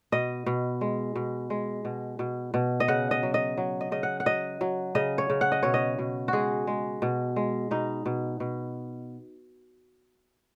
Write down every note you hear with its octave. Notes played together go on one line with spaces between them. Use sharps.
B2 D#5
B2
G#3
B2
G#3
B2
B2
B2
D#5
C#3 F#5
D#5
F#3
D#5
F#3
D#5
C#3 D#5
F#5
F#5
F#3 D#5
F#3
C#3 D#5
C#5
C#3
F#5
D#5
B2 C#5
D#5
B2
G#3 F#4 G#4
G#3
B2
G#3
B2 D#4
B2
B2